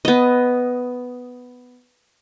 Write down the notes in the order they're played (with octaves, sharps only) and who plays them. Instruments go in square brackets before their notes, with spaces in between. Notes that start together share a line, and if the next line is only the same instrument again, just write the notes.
[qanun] B3 D#5